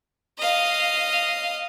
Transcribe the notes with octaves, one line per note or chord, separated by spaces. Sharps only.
D#5 F5